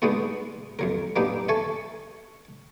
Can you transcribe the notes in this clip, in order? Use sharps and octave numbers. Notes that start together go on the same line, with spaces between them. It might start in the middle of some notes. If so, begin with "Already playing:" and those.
G#3 B3 D4 D#4 F#4 A#4
F2 F#3 A#4
F#3 A#3 B3 D4 D#4 G4
A4 E5 G#5 A5 C#6